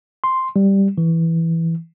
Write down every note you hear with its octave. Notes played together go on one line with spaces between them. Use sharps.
C6
G3
E3